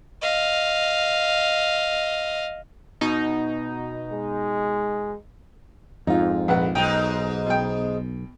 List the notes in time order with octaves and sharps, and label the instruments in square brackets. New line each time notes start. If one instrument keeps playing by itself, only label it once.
[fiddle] D#5 F5
[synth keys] B2 D#4
[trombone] G#3
[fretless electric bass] F2 G#2 [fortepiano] D#4 F4
[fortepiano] A#1 B4 F#5
[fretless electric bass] B1 [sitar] G#2 D#4 [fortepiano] G5
[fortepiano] B2 G5